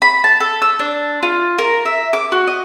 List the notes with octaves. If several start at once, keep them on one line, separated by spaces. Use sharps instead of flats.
B5
A5
A4
E6
D4
F4
A#4
E5
D6
F#4
D#5